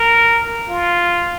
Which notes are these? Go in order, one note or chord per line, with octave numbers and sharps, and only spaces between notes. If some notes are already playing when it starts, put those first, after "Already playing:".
Already playing: A#4
F4